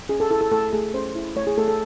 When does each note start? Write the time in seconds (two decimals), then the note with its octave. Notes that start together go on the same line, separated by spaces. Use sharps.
0.09 C#4 G#4
0.20 A4
0.30 E4 A4
0.41 A4
0.51 A3 A4
0.73 A3 G#4
0.94 C#4 C5
1.15 E4
1.36 A3 C#5
1.47 G#4
1.57 A3 A4
1.68 A4